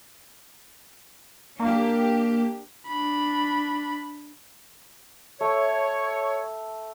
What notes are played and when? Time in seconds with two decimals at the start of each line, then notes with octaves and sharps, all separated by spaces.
1.59 A#3 D4 G4
2.87 D4 B5
5.41 A3 C#5